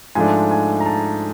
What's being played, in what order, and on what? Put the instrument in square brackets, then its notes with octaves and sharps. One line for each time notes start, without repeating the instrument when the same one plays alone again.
[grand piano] G#2 F3 A3 D4 G#5
G#5
A#5
A5